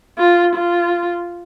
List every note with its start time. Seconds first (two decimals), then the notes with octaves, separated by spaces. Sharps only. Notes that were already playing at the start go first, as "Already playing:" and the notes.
0.18 F4
0.55 F4